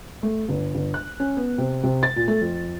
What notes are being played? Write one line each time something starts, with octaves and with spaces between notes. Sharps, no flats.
A3
G1
G1
F#6
C#4
B3
C3
C3
A6
A#2
A3
F2